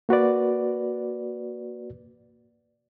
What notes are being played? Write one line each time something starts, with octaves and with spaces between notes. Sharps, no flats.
A#3 F#4 B4 D5